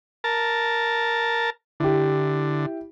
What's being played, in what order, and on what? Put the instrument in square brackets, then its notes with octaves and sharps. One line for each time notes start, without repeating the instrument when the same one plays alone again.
[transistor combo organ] A#4 A5
[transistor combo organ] D3 [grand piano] E4 G4